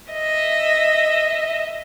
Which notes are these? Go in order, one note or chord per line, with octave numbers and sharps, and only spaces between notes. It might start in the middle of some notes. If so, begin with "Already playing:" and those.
D#5 E5